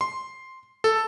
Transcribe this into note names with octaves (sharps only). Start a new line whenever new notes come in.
C6
A4